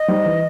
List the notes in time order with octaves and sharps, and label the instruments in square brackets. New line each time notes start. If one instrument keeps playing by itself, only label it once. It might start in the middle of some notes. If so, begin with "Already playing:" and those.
Already playing: [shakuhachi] D#5
[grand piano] G3 D#4 G4 C5
E3